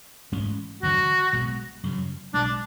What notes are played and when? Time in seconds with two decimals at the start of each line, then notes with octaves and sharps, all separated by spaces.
0.32 A1 G#2 G#3 C#4
0.83 E1 D2 D3 F#3 F#4
1.33 B1 B2 G#3
1.84 F#2 C#3 F#3
2.34 B1 B2 G#3 D4